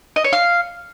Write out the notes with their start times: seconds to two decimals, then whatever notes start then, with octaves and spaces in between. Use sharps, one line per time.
0.16 D#5
0.24 C#5
0.33 F5